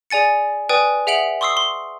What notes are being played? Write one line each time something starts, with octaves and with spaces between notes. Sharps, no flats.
G#4 D5 G#5 A6 C#7
B4 D5 G5 G#5 D#6
G#4 E5 F#5 D7 F7 F#7
C6 C#6 D#6 E6 C7
C6